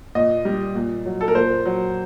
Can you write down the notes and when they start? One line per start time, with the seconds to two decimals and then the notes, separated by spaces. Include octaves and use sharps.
0.15 A#2 D#5
0.45 G3
0.75 A#2
1.06 F#3
1.21 A4
1.28 A#4
1.35 A#2 C5
1.66 F#3